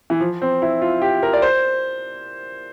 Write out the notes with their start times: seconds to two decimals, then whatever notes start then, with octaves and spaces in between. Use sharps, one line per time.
0.10 E3
0.20 F3
0.42 C4
0.62 E4
0.82 F4
1.01 G4
1.23 A#4
1.34 D5
1.42 C5